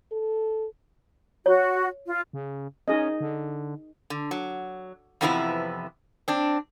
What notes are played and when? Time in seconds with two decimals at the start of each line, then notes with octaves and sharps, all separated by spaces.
0.12 A4
1.46 F#4 C#5
2.06 F4
2.33 C#3
2.88 C#4 D#4 G#4 D#5
3.20 D3
4.10 D3
4.31 F#3
5.21 F2 C3 E3 F3 B3 E4
6.28 C4 D4